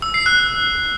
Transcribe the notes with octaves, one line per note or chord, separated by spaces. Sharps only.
E6
C7
F#6